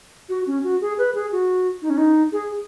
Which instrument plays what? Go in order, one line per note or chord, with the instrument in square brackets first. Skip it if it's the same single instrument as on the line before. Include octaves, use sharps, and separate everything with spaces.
[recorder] F#4
C#4
F#4
G#4
B4
G#4
F#4
D#4
C#4
D#4
G#4